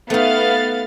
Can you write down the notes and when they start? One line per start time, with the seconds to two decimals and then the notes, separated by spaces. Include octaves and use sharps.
0.10 A3 B3 D#4 F5 A6